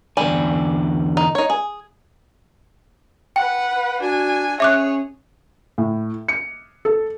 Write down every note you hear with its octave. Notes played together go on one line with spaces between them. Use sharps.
E2 D3 G3 G#5
D#4
D#4 C#5
G#4
B4 F#5 G5
D4 F#4 G#5
C#4 G#4 C#5 E5 D6 F#6
A2
C#7
A4